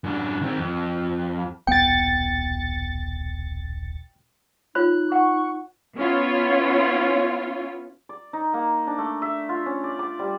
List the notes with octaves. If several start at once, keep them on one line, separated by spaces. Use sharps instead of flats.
F#2 D4
D#3 C4
F2
D#1 B1 B3 G5 A6 C#7
D#4 F4 C#5 B5 F#6
F#5 C#6
B3 C#4 E4 F4 C#5
D5
D#4
A#3
D4
A3
E5
F4
C#4
D5
D6
G3